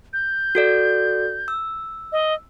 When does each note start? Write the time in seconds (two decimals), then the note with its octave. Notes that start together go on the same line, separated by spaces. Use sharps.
0.13 G6
0.55 F#4 A4 D5
1.48 E6
2.12 D#5